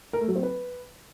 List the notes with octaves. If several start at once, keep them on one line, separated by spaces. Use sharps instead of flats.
A#4
A3
F#3
C4
B4